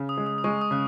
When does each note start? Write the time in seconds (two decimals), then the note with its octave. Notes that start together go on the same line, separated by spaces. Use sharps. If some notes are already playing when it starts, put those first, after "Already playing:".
Already playing: C#3
0.09 D#6
0.18 G#3
0.27 D#6
0.38 D#6
0.44 G#3 C#6
0.61 D#6
0.71 C#3 F#6